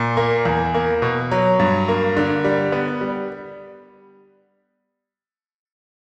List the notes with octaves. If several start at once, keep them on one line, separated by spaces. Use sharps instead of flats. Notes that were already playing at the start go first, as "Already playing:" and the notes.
Already playing: A#2
A#3
E2
A#3
B2
F#3
G2
A#3
D3
G3
B3
G3